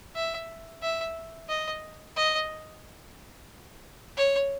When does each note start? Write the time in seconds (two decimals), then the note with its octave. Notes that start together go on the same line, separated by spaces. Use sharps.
0.15 E5
0.82 E5
1.49 D#5
2.16 D#5
4.17 C#5